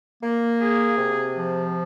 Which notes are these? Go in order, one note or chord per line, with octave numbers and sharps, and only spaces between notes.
A#3
G#4
C3
F3